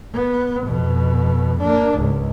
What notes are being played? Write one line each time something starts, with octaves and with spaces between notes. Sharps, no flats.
B3
F2 B2
A#3 D4
C#2 G#2